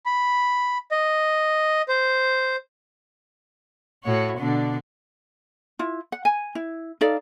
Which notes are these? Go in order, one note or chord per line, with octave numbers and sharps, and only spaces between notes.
B5
D#5
C5
A2 F#4 C#5
B2 D3 D4
E4 F4
F#5
G#5
E4
D#4 A4 D5 F5